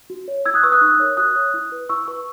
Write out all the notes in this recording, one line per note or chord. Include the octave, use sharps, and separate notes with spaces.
F#4
C#5
E4 E6 G#6
D#6 F#6
B4 C#6 E6
D#6 F#6
D#4
A#4 C#5
F#4 D#6 F#6
C#5
E4
B4
E4 C#6 E6
B4 C#6 E6